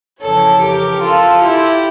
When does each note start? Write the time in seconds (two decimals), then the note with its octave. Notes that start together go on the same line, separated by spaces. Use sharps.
0.22 F2 C#3 E3 A4 C#5
0.62 G4 A#4
1.02 F4 A4
1.43 E4 G4